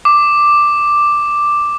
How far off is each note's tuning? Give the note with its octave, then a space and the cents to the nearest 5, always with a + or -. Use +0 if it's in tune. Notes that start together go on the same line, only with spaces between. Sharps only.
D6 +5